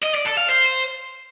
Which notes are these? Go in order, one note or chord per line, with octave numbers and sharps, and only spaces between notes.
D#5
D5
A4
F5
C5